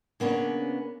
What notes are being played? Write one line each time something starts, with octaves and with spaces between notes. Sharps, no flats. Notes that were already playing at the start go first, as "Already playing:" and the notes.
C#3 A#3 B3 C#4 D4